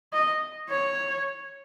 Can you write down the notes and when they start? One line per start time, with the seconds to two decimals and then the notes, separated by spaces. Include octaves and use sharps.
0.13 D#5
0.69 C#5